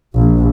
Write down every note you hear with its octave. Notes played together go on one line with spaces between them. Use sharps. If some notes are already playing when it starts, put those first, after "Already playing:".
A#1